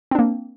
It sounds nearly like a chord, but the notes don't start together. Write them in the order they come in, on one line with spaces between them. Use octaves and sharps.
C4 D4 A#3